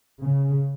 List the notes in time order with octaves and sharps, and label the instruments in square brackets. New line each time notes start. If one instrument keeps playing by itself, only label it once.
[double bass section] C#3